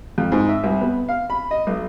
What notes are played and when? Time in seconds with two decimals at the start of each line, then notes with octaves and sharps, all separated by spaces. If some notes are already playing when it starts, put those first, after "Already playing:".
0.18 F2
0.32 G#2
0.49 E5
0.64 C2
0.81 B3
1.09 F5
1.30 B5
1.51 D#5
1.67 B1